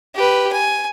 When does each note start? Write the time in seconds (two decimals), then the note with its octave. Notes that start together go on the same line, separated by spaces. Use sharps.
0.15 G4 B4
0.52 G#5